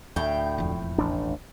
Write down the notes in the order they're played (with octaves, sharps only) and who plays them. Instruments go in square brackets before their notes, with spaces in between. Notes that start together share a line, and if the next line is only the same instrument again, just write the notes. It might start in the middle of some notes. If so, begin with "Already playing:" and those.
[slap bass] D2 [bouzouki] A2 G5
[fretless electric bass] E1 F2
[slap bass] A1 D4